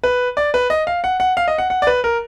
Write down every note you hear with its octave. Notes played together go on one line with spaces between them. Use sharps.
B4
D5
B4
D#5
F5
F#5
F#5
F5
D#5
F#5
F#5
D5
B4
A#4